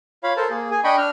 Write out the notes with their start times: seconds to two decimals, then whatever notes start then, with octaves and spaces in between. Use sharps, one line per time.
0.23 F4 C#5 F5 B5
0.37 A4 A#4 C5 A5
0.50 A#3 G#4
0.71 G#4 G#5
0.84 D4 D#5 G5 B5 C#6
0.98 D4 F6